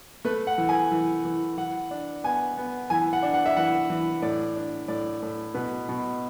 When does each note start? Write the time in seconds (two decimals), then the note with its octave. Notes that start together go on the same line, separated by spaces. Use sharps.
0.25 A3 B4
0.47 F#5
0.58 E3
0.69 G#5
0.92 E3
1.25 E3
1.57 E3 F#5
1.91 D4
2.24 B3 G#5
2.58 B3
2.90 E3 G#5
3.13 F#5
3.23 D4
3.34 F#5
3.46 E5
3.56 E3 F#5
3.90 E3
4.22 A2 D5
4.56 D4
4.88 A2 D5
5.22 A2
5.55 B2 B4
5.89 B2